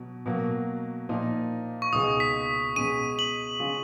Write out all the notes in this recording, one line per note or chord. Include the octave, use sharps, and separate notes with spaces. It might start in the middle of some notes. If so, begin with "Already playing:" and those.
Already playing: B2 F#3
B2 F#3 A#3
A#2 F3 A#3 D#4 A#4
C#6
C#2 B2 G#3 D#4 G#4 D#6
B6
B2 G#3 C#4 G#4 D#7
F#7
C#3 G#3 C#4 F4